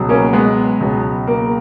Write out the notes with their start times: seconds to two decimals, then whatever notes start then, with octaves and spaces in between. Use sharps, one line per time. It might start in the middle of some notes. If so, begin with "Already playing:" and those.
Already playing: C#2 B2 F#3
0.09 A#3 C#4
0.33 G#3 B3
0.81 C#2 B2 F#3
1.27 A#3